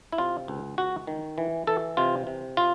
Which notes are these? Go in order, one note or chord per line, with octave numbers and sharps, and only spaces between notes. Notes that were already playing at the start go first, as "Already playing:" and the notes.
E4
C3 F4
C#2
C#2 F#4
D#3
E3
E3 A4
C3 F4
C3
F4